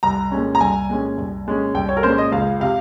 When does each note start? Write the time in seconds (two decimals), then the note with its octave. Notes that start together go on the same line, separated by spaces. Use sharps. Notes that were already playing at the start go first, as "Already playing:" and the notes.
0.03 C2 A#5
0.31 A#2 G#3 C#4
0.55 A#5
0.60 C2 G#5
0.89 A#2 G#3 C#4
1.18 C2
1.47 A#2 G#3 C#4
1.74 C2 G5
1.89 C#5
1.97 A#4
2.03 A#2 G#3 C#4 C5
2.18 D#5
2.32 C#2 F5
2.60 C3 F5